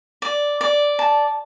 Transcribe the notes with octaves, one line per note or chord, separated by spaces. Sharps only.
D5
D5
A5